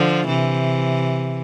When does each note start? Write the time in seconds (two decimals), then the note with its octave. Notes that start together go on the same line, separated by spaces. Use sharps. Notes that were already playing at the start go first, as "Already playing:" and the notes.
Already playing: D3 F3
0.28 C3 E3